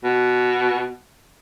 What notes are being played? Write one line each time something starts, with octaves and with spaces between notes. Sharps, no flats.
B2